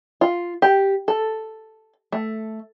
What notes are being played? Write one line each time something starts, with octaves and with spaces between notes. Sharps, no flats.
F4
G4
A4
A3